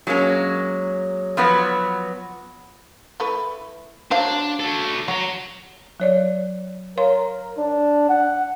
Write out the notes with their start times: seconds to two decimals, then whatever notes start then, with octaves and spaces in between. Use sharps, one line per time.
0.07 F#3 G#3 A#3 C#4
1.37 F3 F#3 B3 F#4 B4 C#5
3.20 E3 A3 B4
4.11 F#3 D4 C5 F5
4.60 F#4 A4
5.08 F#3 F#4 A#5
6.00 F#3 C#5 D5
6.98 A#4 C#5 F5 C6
7.58 D4
8.09 F#5